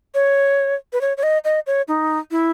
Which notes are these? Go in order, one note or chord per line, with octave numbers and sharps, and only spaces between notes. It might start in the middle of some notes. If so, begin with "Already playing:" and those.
C#5
B4
C#5
C#5
D#5
D#5
C#5
D#4
E4